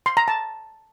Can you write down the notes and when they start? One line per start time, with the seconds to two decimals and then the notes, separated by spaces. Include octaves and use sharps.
0.06 C6
0.17 A#5
0.28 A5